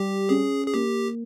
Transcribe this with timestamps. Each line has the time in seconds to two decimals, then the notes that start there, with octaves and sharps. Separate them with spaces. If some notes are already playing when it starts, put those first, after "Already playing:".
Already playing: G3 G4
0.29 C#4 G#4
0.66 G#4
0.73 A#3 G4